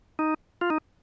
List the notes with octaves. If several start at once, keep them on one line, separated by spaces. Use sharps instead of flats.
D#4
F4
D#4